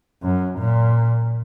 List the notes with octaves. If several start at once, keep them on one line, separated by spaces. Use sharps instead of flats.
F#2
A#2